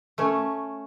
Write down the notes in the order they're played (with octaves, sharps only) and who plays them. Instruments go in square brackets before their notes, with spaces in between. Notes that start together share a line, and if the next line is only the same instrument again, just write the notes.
[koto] A3 C#4